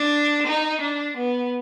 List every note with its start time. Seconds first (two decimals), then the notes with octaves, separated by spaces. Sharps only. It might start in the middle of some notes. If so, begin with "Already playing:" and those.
Already playing: D4
0.46 D#4
0.81 D4
1.17 B3